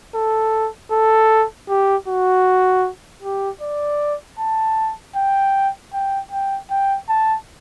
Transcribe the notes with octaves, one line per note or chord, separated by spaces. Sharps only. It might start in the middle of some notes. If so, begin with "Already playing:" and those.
A4
A4
G4
F#4
G4
D5
A5
G5
G5
G5
G5
A5